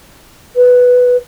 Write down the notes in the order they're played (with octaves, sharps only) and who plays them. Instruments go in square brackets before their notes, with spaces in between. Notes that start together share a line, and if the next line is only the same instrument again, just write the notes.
[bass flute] B4